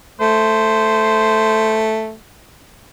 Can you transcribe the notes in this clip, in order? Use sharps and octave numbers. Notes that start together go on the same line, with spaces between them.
A3 C5